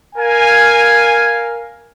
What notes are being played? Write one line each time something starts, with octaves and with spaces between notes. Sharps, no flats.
A#4 F5 G#5